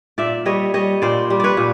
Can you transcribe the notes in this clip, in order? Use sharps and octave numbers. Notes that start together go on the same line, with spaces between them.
A#2 D5 E5
G3 C#5 D#5
G3 C#5 D#5
A#2 C5 D5
G3
B4 C#5 D5
A#2